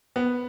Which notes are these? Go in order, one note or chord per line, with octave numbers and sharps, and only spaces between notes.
B3